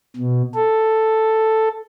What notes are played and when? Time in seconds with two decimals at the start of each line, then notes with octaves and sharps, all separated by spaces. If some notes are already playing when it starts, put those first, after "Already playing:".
0.17 B2
0.55 A4